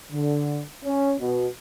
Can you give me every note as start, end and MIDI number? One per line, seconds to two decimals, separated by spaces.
0.12 0.62 50
0.85 1.13 61
1.20 1.47 47